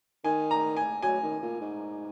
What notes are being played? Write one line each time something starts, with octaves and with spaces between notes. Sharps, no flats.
D#3 G#5
A#5
G#5
F#3 G#5
D#3
A#2
G#2